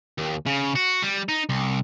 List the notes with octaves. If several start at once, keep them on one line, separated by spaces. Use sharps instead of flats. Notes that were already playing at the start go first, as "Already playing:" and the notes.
D#2
C#3
F#4
G3
D#4
C2